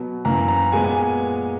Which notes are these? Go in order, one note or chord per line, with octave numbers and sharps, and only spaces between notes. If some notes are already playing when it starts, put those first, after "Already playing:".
Already playing: B2 F#3 B3
F#2 E3 A#3 A#5
A#5
A#2 G#3 B3 G#5
G#5